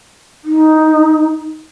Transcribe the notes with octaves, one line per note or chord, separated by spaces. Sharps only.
D#4